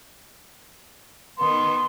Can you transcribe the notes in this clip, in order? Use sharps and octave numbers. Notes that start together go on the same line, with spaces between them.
D#3 B3 C6